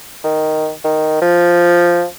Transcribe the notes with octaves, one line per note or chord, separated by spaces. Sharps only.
D#3
D#3
F3